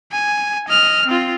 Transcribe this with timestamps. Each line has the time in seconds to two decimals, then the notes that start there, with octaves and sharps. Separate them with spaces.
0.12 G#5
0.69 D#5 F6
1.07 C4 F4